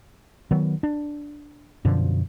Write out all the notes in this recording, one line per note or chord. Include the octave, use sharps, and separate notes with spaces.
D#3 F#3 B3
D4
F#2 B2 D3 F3